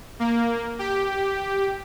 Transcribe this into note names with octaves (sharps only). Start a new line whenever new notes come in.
A#3
G4